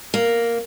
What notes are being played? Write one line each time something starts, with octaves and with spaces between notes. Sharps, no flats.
A#3